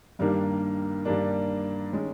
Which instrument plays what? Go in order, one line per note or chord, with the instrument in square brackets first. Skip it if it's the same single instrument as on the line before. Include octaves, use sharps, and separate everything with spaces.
[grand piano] G2 D#3 G3 A#3 D4
G2 D#3 G3 A#3 D4
D#3 G#3 C#4